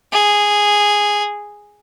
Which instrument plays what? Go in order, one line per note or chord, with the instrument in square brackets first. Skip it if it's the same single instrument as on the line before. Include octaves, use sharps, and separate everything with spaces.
[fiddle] G#4